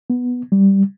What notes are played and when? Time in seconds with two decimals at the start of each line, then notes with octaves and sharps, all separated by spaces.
0.10 B3
0.52 G3